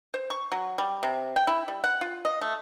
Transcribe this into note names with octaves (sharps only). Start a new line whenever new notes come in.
C5
C#6
F#3
G3
C3
G5
E4
G3
F#5
F4
D#5
A3